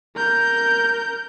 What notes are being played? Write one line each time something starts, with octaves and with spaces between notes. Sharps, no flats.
A#4 G6